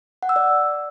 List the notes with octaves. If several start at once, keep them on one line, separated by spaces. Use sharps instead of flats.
F#5
E6
D5